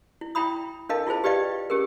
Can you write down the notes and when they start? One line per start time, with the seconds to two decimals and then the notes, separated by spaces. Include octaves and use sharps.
0.21 E4
0.35 E4 G5 A#5 B5 D#6
0.89 D4 A4 A#4 D#5 F5 A5
1.07 E4 F4 G#4 C5 A5
1.24 G4 B4 D5 D#5 F5 G5
1.70 C#4 G4 G#4 A#4